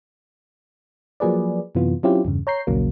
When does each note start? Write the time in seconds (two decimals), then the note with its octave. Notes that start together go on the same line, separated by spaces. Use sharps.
1.20 F3 F#3 A#3 G#4 B4 D5
1.75 F#2 C3 E3 B3 F4
2.03 F#3 C4 C#4 E4 F4 G4
2.25 E2 G2 C#3
2.47 C#5 A#5 G6 C7
2.67 A#1 D#2 C#3 F#3 A#3